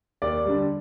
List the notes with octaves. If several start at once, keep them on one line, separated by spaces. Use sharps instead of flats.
D#2 D5
D3 G3